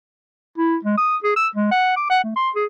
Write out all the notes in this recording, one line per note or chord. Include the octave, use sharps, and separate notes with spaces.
E4
G#3
D#6
G#4
E6
G#3
F#5
D6
F#5
A3
C6
G#4